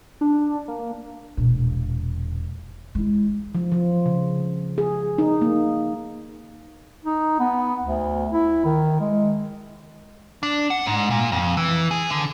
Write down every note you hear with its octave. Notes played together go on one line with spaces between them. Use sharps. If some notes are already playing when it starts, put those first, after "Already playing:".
D4
A#3
E1 A#2
G#3 E4
F3
F3
C#3
G#4
D#4
A#3
D#4
B3
D2
E4
D#3
G#3
D4
F#5
G#2
A#2
F2
E3
G#4
D3